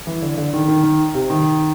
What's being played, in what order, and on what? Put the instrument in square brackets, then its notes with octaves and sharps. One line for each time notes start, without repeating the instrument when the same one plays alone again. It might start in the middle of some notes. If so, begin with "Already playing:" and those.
[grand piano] E3
D3
D3
D#3
D#3
D#3
C3
D#3